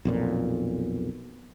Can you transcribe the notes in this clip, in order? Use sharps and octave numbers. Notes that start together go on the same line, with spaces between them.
B1 F2 A#2